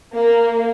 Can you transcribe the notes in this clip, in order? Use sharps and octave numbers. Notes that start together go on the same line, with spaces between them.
A#3